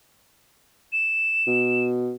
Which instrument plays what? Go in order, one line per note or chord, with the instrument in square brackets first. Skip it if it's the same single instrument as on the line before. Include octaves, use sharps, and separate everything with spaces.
[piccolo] E7
[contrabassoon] B2